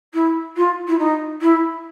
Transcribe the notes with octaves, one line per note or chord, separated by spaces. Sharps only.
E4
F4
E4
D#4
E4